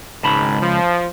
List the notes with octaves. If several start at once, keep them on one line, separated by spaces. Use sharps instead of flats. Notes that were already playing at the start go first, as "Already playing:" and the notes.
G#1 C#2 G#2 A5 B5
F3